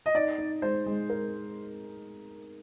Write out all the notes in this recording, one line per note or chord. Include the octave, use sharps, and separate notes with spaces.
D#5
D#4 D5
D#4
G#3 C5
G#3
A#4